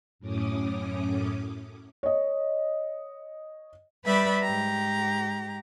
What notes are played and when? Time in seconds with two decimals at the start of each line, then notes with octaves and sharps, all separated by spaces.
0.19 F#2 A2 C#4 D6 D#6
2.03 C#5 D#5
4.05 G3 B4 D5 E5 B5
4.42 G#2 G4 A#5